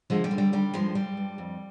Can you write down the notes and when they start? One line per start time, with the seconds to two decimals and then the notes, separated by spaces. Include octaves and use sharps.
0.10 D3 F3 G#3
0.24 G3
0.31 D3
0.38 G3
0.53 D#3 G3
0.74 G2 F3 G#3
0.95 G2 G3
1.17 G2
1.38 F2